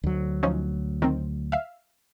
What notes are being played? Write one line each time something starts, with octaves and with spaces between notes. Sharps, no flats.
D2 F#3
F3 C#4 D#4
D#3 C4
E5 F5